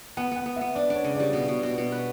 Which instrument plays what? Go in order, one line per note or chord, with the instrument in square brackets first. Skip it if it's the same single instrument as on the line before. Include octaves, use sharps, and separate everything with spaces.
[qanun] B3 [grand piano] F#5
[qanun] B3 [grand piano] F#5
[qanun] B3
[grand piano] E5
[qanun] B3
[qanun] D4 [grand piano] D5
[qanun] D4 [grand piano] C#5
[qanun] C#3
[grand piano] D5
[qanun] G3
B2
B2
B2
B2
B4